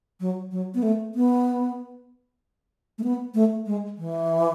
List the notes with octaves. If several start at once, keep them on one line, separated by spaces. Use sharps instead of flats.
F#3
F#3
B3
A3
B3
A3
B3
A3
G#3
E3